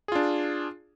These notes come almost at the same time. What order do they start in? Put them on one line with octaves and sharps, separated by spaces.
G#4 F4 D4